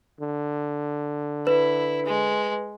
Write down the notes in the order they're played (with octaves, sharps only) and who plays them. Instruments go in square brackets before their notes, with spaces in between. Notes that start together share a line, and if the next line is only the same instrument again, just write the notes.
[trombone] D3
[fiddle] E4 [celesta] B4
[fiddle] G#3